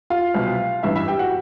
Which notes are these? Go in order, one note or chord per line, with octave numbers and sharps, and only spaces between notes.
F4 F5
C2 B2 F#3
A1 G2 E3 E4 E5
E4 E5
G4 G5
F#4 F#5